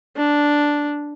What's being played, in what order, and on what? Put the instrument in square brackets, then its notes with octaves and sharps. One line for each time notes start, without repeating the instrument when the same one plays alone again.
[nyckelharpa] D4